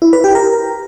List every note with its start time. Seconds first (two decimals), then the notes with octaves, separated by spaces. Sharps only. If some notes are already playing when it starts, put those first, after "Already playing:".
0.02 E4
0.13 B4
0.24 G4
0.35 A#4